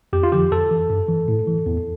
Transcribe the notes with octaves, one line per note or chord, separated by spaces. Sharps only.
F2 G4
F4
D3 F3 G4
F2 A4
E3
G2
E3
A2
E3
E2